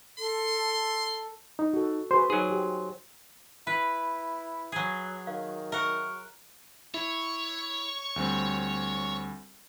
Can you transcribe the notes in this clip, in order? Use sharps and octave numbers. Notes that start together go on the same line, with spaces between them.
A4 C6
D#4
F#4 A4
F#4 G#4 B4 C5 C6
F#3 D#4 G#4
G4
E4 B4
F#3 G#4
D#3 F5
A#4 E5 F#5 C#6 F6
E4 C#5
D2 G3 C4